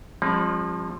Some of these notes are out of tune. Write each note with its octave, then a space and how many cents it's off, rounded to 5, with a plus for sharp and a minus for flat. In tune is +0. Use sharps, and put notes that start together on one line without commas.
F3 +10 G#3 -45 C4 +45